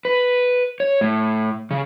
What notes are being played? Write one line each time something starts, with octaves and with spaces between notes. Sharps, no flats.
B4
C#5
A2
C#3